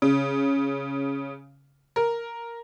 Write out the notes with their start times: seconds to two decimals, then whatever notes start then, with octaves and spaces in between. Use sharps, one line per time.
0.02 C#3
1.96 A#4